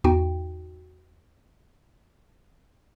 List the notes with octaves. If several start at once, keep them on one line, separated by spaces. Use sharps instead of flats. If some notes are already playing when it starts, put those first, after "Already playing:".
E2 G#2 D#4 F#4 G5